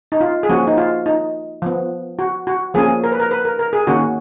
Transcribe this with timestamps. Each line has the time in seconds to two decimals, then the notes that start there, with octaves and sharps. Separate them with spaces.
0.12 D#4
0.21 F4
0.43 G#4
0.49 F3 A#3 C#4 F#4
0.67 D#4
0.77 F4
1.06 D#4
1.62 F3 B3
2.19 F#4
2.47 F#4
2.74 F3 A#3 C#4 G#4
3.04 A#4
3.12 B4
3.20 A#4
3.31 B4
3.45 A#4
3.59 A#4
3.73 G#4
3.87 D#3 A#3 C#4 F#4